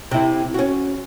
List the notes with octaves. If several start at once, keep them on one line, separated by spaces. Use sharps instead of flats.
C3 E4
C#4 F#4